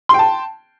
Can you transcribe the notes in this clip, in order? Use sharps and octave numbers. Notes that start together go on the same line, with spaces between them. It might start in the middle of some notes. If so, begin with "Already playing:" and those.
G5 A5 C6